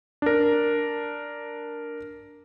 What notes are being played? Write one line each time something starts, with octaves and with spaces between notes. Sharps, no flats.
D4 A#4